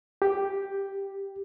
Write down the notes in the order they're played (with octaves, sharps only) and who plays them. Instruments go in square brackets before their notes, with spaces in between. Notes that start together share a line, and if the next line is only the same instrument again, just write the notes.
[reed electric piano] G4